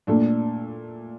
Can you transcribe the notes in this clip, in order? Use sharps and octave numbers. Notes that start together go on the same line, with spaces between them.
A#2 A3 D4 A4